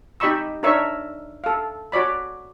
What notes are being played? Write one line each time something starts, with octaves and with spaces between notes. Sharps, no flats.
D#4 G4 D#5 B5 C#6 E6
D4 D#4 A#4 C#5 E5 C#6
A4 F5
F#4 C#5 D5 B5